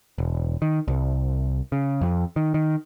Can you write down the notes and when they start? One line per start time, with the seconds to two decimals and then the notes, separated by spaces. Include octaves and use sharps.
0.18 E1
0.62 D#3
0.88 C2
1.72 C#3
2.01 F2
2.36 D#3
2.54 D#3